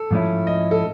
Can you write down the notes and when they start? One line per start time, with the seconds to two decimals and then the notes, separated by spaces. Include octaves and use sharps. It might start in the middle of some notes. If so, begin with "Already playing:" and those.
Already playing: A4
0.11 G#2 F3 A3 C#4 E4
0.47 D#5
0.71 A4